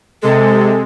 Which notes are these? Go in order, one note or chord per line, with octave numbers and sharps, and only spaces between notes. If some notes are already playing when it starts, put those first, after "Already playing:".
C3 G#3 A4